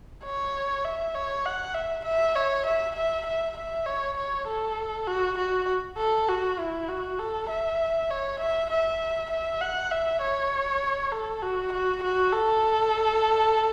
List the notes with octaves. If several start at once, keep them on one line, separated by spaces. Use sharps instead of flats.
C#5
E5
C#5
F#5
E5
E5
C#5
E5
E5
E5
E5
C#5
C#5
A4
F#4
F#4
A4
F#4
E4
F#4
A4
E5
C#5
E5
E5
E5
F#5
E5
C#5
A4
F#4
F#4
F#4
A4